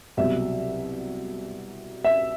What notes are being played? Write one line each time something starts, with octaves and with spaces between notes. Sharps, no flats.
C2 B2 F#3 E5
E5